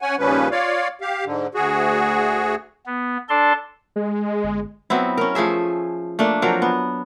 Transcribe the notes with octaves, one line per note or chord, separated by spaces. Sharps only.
C#4 C#5 F#5 G#5
D#2 C#3 F3 G3 C#4 B4
F4 C#5 D5 F5
G4 F5
G#2 D3
D2 F#4 G#4
B3
D4 A4 D5 A5 C6
G#3
G1
F#3 B3 C4 E4
C#4 A#4
F3 A3 G#4 E5
A3 A#3 D4
F3 F#3 C4 A#4
B3